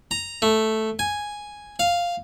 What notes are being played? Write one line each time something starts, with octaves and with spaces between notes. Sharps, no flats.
A#5
A3
G#5
F5